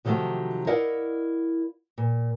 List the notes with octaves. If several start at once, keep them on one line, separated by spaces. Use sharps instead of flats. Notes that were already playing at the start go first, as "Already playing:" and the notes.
C3 D#3 F3 F#3 A3
E4 A#4 D5 D#5 F5 F#5
A#2